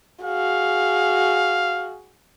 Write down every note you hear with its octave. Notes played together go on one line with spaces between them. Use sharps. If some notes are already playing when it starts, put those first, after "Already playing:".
F#4 G#4 F5